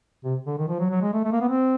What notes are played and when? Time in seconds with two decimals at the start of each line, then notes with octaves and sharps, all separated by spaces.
0.24 C3
0.47 D3
0.58 D#3
0.69 F3
0.80 F#3
0.91 F#3
1.02 G#3
1.14 A3
1.25 A3
1.32 A#3
1.41 B3
1.49 C4